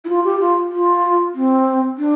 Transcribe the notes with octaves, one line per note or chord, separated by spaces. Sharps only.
E4
F4
G4
F4
F4
C4
D4